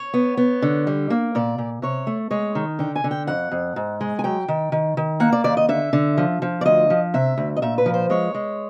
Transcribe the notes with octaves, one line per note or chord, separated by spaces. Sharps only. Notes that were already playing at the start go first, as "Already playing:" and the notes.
Already playing: C#5
B3
B3
D3
G3
A#3
A#2 D5
A#2
C3 C#5
A3
G#3 C#5
D#3
D3 G5
G#5
D3
G5
F2 F#5
F2
G#2
G#3
G#5
F#3 G5
D#3
D#3
D#3
A#3 F#5
D5
D#2 D5
D#5
D3 E5
D3
F3
F3
D5
D2 D#5
F3
C3 E5
D2
D#5
A#2 E5
B4
F3
C5
G#3 C#5
G#3